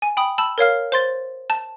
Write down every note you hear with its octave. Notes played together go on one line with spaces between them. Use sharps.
G#5
G5 B5 D#6
A5 B5 E6
A#4 C#5 F5 F6
C5 C6 A6
A5